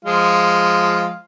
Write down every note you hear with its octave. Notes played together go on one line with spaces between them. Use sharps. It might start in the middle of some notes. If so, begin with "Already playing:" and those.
F3 G#3 F4